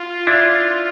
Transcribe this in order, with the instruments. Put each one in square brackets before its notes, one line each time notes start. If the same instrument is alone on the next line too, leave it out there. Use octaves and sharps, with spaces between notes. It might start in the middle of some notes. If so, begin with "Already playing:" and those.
Already playing: [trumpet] F4
[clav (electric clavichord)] D4 E4